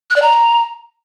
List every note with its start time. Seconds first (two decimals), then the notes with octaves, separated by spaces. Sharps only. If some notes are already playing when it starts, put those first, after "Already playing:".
0.10 F#6
0.16 D5
0.22 A#5